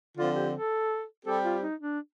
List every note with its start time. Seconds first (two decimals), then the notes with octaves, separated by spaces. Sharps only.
0.16 D3 F3 C4 F4
0.35 G4
0.54 A4
1.26 G3 C4 G4 A4
1.44 F4
1.62 D#4
1.80 D4